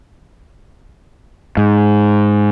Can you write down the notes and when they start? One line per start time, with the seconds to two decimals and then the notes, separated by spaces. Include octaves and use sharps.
1.57 G#2